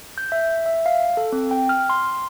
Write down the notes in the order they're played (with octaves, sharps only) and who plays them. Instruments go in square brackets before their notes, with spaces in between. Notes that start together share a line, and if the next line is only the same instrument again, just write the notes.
[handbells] G6
E5
E5
F5
A4
C4
G5
F6
C6